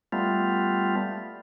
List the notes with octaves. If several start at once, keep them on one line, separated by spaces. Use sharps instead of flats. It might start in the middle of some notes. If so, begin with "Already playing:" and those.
G3 A3 B3 F4